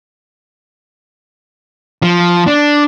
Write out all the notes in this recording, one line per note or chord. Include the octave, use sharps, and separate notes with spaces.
F3
D4